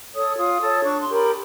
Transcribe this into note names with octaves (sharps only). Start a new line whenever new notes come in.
A4 C#5 D#6
F4 D#6
A4 C#5
D4 C#6
C6
G4 A#4
B5